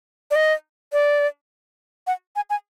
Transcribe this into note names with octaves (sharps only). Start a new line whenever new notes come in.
D5
D#5
D5
F#5
G#5
G#5